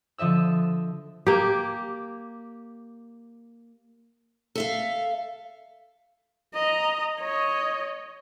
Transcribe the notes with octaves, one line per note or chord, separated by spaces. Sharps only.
D3 F3 D#5 E5 E6
A#3 G4
A4 E5 F5
D#5 A#5
C#5 D#5